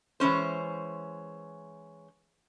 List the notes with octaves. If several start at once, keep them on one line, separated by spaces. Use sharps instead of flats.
E3 G#3 C#4 C5